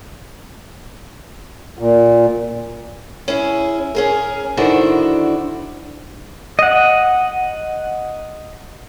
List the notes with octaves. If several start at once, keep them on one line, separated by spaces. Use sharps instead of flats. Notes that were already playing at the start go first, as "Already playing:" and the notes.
A#2
C#4 E4 G#4
C#4 G#4 A#4
D3 D#3 D4 E4 F#4 C5
D#5 F#5